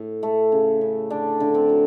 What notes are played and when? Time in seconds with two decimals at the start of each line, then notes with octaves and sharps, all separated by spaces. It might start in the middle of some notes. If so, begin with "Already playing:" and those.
Already playing: A2
0.23 A3
0.52 C#3
0.81 C#3
1.10 D3 D4
1.40 D3
1.54 C4
1.69 F#3